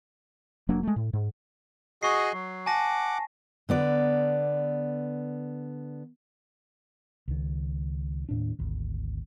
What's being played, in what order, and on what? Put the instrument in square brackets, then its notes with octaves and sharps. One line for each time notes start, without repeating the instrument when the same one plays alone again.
[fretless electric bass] F1 F#3 A#3 D4
G#3 A3
A2
G#2
[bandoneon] F#4 G#4 D#5 [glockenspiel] C#6 C7
[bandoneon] F#3
[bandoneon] F#5 D6 [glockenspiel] G#5 A5 A#6
[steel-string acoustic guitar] D3 B3 D5
[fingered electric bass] C#2 D#3
D#2 A2 D4
G#1 D2